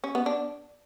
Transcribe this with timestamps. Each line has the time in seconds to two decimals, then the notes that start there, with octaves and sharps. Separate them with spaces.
0.04 C#4
0.15 B3
0.26 D4